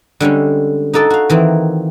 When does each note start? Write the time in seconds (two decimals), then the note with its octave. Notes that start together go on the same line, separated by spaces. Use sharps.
0.20 D3 G3 G#3 C#4
0.94 D#4 F#4 A4 D5 A5
1.10 F#4 F5
1.30 D#3 E3 A#3 C4